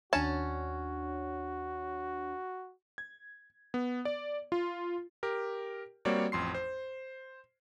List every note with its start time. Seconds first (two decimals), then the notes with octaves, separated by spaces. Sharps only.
0.13 D#2 C#4 D4 F#4 C#5 A5
2.98 G#6
3.74 B3
4.05 D5
4.52 F4
5.23 G4 A#4
6.05 G3 A#3 C4 F#4 C#5 D5
6.32 A1 F2 C6 C7
6.54 C5